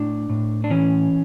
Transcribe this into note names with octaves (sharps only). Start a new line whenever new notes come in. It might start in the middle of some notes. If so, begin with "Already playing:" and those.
Already playing: A2 D4
A2
D4
E3 C#4